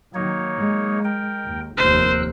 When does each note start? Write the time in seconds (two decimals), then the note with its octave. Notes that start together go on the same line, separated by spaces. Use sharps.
0.14 D#3 F#3 A#3 D#4 C#5
0.58 G#3
1.04 A#4 G5
1.45 D#2
1.77 F1 D#2 A#4 C5 E6 F#6